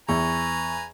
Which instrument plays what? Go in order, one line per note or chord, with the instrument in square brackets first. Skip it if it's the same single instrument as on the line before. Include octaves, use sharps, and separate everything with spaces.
[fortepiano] E2 [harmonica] B4 G#5 A#5 [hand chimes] C#6